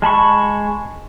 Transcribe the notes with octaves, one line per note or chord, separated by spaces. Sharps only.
G#3 A5 B5 C#6